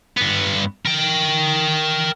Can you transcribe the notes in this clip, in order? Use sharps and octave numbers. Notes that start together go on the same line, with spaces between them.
G2 B3
A#4 G5